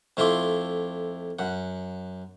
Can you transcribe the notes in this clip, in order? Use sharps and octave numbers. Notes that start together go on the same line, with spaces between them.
F2 A3 E4 F4 C6 D6
F#2 F#5